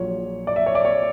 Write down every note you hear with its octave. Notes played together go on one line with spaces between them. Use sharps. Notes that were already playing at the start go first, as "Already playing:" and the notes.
Already playing: A#1 A#2 F#3 C#5
D5
E5
C#5
D5
C#5